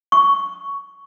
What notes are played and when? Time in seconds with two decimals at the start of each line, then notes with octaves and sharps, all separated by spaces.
0.12 C#6